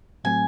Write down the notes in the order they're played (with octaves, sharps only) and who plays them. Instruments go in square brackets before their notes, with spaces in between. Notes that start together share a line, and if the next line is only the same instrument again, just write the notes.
[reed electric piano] A2 F#3 A3 C4 [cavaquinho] G#5